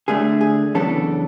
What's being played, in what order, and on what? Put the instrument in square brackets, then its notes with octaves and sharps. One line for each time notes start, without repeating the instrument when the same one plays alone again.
[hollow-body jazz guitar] D3 A3 D4 G#4
G#4
F#2 C#3 E3 B3 D4 A4